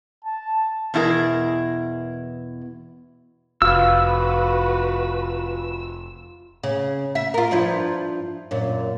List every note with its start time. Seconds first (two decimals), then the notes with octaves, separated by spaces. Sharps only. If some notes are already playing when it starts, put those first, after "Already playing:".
0.24 A5
0.94 E2 B2 E4 G#4 A#4
3.62 F1 F4 F#4 B4 E6
6.63 C#3
7.15 E5
7.34 F4 A#4
7.51 G2 F3 E4
8.51 F#2 A#2